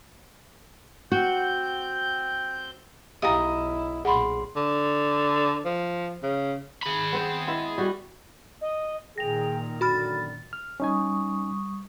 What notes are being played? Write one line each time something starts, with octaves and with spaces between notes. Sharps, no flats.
C4 F#4 G6
B1 E4 G4 D#5 F5 G5 A#5
B1 A#2 G#4 F#5 B5 C6
D3
F3
C#3
G#4 B5
B3 C4 C5
G#3 B3 E4
G3 F#4
D#5
A#2 D#3 G#4 G5 A#6 F7
F#2 D3 F#4 B5 F6 A6
F6
G3 C#4 D#4 G#5 C#6 D#6